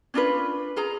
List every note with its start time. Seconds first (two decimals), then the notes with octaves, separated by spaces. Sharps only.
0.14 C#4 D4 F4 B4
0.76 F4 G#4 A#5